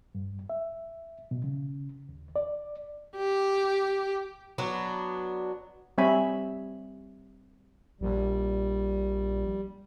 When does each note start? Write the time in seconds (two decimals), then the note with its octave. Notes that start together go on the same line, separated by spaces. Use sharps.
0.15 G2
0.50 E5
1.31 B2
1.44 C#3
2.09 D#2
2.36 D5
3.16 G4
4.58 F#3 B3 D4
5.98 G3 C4 C#5 E5 G#5 B5
8.01 A#1 G3